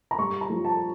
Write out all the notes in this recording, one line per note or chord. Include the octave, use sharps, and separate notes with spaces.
A#5
G2 C#6
A#5
F3
A5